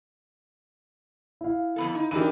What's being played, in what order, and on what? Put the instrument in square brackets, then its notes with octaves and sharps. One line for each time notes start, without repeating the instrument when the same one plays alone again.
[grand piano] E4 F5
[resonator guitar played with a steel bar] F2 B3 A4
D#4
[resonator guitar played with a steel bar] E3 D4 D#4 [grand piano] G4 A#4 D#7